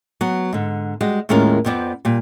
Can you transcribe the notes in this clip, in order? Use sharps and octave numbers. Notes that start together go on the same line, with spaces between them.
F#3 B3
G#2 D3
G3 G#3 F#4
D#2 A2 G#3 C#4 F4 A#4
F2 F3 B3 C4 D5
A#2 G3